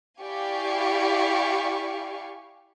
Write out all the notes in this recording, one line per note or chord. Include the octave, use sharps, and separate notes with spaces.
E4 G4 D5 F5 G#5 C#6